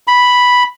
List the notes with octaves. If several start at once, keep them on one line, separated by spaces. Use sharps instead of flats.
B5